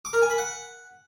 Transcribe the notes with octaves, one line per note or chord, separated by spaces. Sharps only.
D6
A#4
G#5
B5
F#5